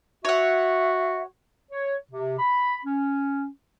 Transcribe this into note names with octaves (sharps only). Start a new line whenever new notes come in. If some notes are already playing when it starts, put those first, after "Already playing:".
F#4 C#5 E5 F#5
C#5
C3
B5
C#4